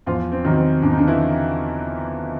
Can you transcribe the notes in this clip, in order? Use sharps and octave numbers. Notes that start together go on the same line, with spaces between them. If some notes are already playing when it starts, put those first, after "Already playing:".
E2 F3 F4
C4
C3 D#3 F#3
C4
E2 D4
D#4
D3 D4
E3 E4